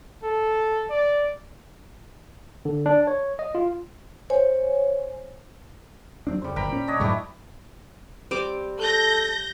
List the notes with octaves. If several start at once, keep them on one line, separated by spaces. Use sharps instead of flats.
A4
D5
D3
D4
C#5
D#5
F4
C5 C#5 G#5
F#3 C4 D4
F2 C#3 G3 C5
G1 G5 A#5 B5
A#2 C#4
D4 C#5 D#5
F#2 A2 G#3 E4 G4 C#5
G3 C4 D6
A4 G6 A#6